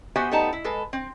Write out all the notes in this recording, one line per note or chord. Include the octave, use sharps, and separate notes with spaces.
B3 F#4 G4 C5 E5 G#5
G3 A3 B3 D#4 A5
E4
G#3 A4 B4
C4